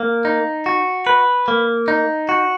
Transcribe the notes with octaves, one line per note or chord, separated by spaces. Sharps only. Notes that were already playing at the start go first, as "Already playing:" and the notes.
Already playing: A#3
D#4
F#4
B4
A#3
D#4
F#4